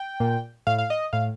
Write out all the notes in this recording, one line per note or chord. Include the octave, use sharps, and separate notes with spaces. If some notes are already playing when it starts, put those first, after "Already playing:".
Already playing: G5
A#2
A2 F5
F5
D#5
A2 F5